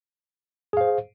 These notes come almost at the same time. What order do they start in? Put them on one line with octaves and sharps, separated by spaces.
G#4 F5 C5